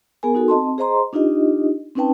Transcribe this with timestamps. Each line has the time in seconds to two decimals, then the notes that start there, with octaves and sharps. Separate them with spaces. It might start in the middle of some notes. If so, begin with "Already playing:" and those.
0.23 B3 G#4 A#4 G#5
0.35 D#4 F#4 A4
0.48 C4 D#5 A5 C6
0.78 G#4 C5 D#5 A#5 C6
1.13 D4 D#4 F4 G4 D#5
1.95 C4 C#4 D#4 B4 G5 A5